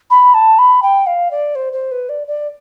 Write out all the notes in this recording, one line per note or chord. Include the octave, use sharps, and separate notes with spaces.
B5
A5
B5
G5
F5
D5
C5
C5
B4
D5
D5